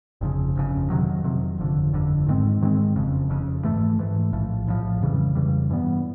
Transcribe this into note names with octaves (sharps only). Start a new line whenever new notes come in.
G1 F2 C#3
G1 F2 C#3
F2 C3 D#3 F#3
F2 C3 D#3 F#3
G1 F2 D3
G1 F2 D3
G#2 D#3 G#3 C4
G#2 D#3 G#3 C4
F#1 F2 C#3
F#1 F2 C#3
G#2 E3 A3
G#2 E3 A3
A#1 A2 F3
A#1 A2 F3
F2 C#3 E3 G3
F2 C#3 E3 G3
G2 E3 G3 B3